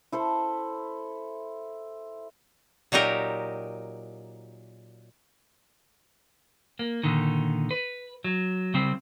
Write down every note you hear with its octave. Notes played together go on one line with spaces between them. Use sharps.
E4 A4 C5
A#2 F#3 D#4 G4 A#4
A#3
A#2 D3 D#3
B4
F#3
C#3 G3 C4